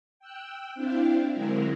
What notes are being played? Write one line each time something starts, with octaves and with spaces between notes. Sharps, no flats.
G5 E6 F#6
C4 D4 E4 F5 G5
D3 F#3 G#3 C4 E4 A#4